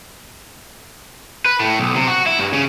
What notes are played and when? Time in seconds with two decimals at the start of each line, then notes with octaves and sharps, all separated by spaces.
1.45 B4
1.60 A2
1.79 B1
1.96 C3
2.08 F#4
2.26 E4
2.39 G2
2.53 C#3